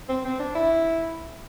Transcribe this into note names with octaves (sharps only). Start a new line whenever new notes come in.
C4
C4
D4
E4